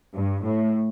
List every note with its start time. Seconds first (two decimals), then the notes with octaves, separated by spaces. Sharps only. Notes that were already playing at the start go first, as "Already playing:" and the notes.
0.14 G2
0.44 A2